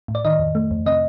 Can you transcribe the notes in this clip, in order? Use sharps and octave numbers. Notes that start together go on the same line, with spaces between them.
A2
D5
D#3 D#5
F2
A3
F2
C3 D#5